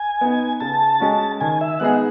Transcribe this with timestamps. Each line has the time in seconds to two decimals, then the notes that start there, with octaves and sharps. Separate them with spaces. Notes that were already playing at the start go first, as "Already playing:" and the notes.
Already playing: G#5
0.21 B3 D#4
0.60 C#3 A5
1.00 G#3 C#4 F#4
1.41 D#3 G#5
1.61 E5
1.80 G#3 B3 D#4 G#4 F#5